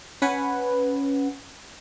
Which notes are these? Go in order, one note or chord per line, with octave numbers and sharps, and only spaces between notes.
C#4 B4 F#5 G#5